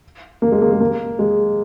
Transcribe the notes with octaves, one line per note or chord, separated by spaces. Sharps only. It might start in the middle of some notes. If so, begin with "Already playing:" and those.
A#3
G#3
A#3
G#3
A#3
G#3